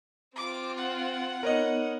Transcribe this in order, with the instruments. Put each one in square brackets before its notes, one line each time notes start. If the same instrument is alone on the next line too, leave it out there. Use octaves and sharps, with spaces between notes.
[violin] C4 F4 [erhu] D6
[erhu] F#5
[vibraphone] B3 D#4 [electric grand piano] A#4 C#5 D#5